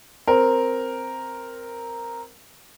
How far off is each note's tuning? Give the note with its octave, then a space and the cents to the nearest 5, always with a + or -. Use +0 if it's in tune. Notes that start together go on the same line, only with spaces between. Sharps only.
C4 +0 A#4 +0